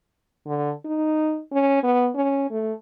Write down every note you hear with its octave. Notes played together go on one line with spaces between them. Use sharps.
D3
D#4
C#4
B3
C#4
A3